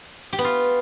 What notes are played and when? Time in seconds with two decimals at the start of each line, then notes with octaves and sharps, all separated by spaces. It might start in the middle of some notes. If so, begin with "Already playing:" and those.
0.33 G4
0.39 B3
0.44 F4